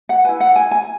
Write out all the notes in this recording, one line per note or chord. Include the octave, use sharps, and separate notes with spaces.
F#5
E4 B4 G#5
F#5
G#5
G#5